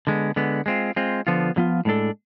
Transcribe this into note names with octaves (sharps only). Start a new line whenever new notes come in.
D3 G#3 B3
D3 G#3 B3
G#3 C4 F4
G#3 C4 F4
D3 F3 B3 F4
D3 F3 B3 F4
A2 G#3 D4 A4